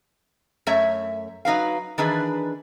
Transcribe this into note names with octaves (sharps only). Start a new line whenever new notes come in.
F#2 A3 C#5 E5
F#3 D#4 B4 F5
D#3 E3 D4 G#4 B4